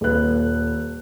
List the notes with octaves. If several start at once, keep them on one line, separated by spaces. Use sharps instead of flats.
D#1 A4 B4 F#6